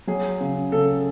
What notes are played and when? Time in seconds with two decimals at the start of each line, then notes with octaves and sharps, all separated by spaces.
0.07 F#3 G#4
0.41 C#3
0.72 C#3 A4